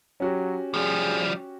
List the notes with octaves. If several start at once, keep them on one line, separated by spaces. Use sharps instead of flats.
F#3 C#4 F#4 G4
F3 G3 G#4